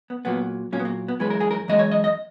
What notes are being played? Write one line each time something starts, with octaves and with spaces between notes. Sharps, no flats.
B3
A#2 F#3 A#3 B3
A#2 F#3 A#3 C#4
B3
A#3
B3
F#2 E3 G#3 B4
A#4
G#4
A#4
F#2 E3 G#3 D#5
C#5
D#5
D#5